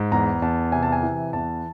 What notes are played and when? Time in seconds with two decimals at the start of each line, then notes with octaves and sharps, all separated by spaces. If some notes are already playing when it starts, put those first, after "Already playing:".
Already playing: G#2
0.12 E2 A#5
0.42 E2 A5
0.72 C3 G#5
0.83 A5
0.92 G#5
1.03 E3
1.33 E2 A5